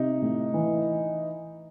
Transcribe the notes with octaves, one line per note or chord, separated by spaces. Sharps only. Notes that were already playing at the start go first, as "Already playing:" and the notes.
Already playing: C3 D#4
A2
E3